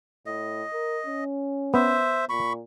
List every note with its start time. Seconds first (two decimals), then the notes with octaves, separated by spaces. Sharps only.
0.26 A2 D#5
0.73 A#4
1.06 C#4
1.74 B3 C5 E5
2.29 A#2 B5 C#6